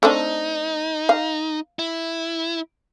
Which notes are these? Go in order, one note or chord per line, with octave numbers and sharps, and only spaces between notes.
A3 C4 D4 D#4
F5
E4